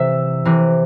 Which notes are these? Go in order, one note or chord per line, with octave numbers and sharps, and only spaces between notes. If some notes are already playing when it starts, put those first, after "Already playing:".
Already playing: C3 E3 E5
C3 E3